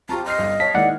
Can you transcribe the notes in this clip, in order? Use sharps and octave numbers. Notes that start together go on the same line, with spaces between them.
C4 F4 G4 A5 A#5 C#6
D#5 C6 F6 C7
G1
C#5 F5 A5 B6
D#3 G#3 A#3 E4 D5 F#5